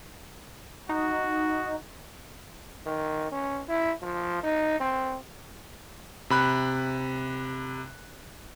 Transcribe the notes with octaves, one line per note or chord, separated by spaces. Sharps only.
D#4 F#4
D#3
C#4
E4
F3
D#4
C4
C3 B5 F#6